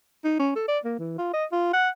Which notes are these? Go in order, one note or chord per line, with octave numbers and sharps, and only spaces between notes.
D#4
C#4
A4
D5
A#3
E3
F4
D#5
F4
F#5